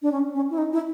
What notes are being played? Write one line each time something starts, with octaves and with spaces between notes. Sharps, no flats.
D4
C#4
C#4
E4
D#4
E4